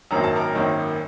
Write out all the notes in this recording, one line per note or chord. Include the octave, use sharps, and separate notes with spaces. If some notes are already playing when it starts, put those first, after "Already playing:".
G#1 F#2 D#3 F#3 A#3 A#5
A5
A#4 A#5
G#1 F#2 D#3 F#3 A#3